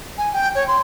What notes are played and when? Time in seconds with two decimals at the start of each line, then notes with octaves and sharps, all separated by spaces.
0.18 G#5
0.33 G5
0.55 C#5
0.68 C6